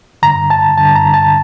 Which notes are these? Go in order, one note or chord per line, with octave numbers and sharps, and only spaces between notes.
G2 D3 A#5
A5
G2 D3 A5
A#5
A5